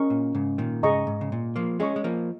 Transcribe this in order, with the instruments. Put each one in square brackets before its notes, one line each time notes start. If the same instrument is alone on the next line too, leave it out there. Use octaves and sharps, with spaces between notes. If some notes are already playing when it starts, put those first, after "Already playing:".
Already playing: [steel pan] C#4 A#4 D#5 C#6
[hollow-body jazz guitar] A#2
G#2 C#3
A#2 D#3
[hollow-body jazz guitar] G#2 C#3 [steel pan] G#4 D#5 A#5 C#6
[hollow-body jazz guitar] G#2
C#3
A#2
F3 A#3
[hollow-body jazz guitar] G#3 C#4 [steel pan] G#4 D#5 C#6
[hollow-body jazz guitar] G#3
F3 A#3